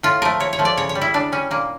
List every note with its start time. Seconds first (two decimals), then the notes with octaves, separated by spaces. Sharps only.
0.03 A2 F4
0.22 F3 A3 A#4
0.40 A2 C#5
0.53 C#5
0.59 F3 A3
0.65 D5
0.77 C#3 C#5
0.89 C#5
0.95 G3
1.01 E4
1.14 C#3 D4
1.32 G3 C#4
1.51 A#2 A#3